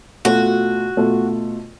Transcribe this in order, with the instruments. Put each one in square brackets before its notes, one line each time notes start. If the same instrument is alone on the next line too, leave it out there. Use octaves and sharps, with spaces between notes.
[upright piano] B2 A3 F4 A4 [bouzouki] F#4
[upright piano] B2 A3 F4 A4